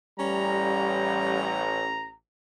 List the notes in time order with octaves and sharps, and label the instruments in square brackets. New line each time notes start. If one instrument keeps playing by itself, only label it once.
[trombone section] A1 [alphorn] G3 [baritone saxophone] C#4 [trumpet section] A#5